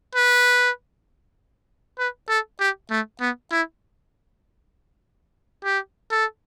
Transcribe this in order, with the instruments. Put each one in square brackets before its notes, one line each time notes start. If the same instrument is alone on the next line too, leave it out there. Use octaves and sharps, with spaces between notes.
[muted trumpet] B4
B4
A4
G4
A3
B3
E4
G4
A4